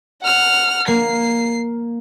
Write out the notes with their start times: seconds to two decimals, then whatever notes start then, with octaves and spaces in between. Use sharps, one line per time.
0.22 F#5 F6
0.88 A#3 C7